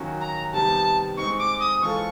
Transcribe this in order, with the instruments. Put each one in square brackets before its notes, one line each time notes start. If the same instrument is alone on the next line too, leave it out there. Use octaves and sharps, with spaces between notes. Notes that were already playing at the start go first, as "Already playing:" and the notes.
Already playing: [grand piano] D#3 F#3 A#3 C#4 F#4
[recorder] A#5
[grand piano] C3 D#3 G3 B3 [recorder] A5
[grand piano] G#3 C4 D#4 [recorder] C#6
[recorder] D6
D#6
[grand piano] E3 G#3 C4 F4 A4 [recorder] C#6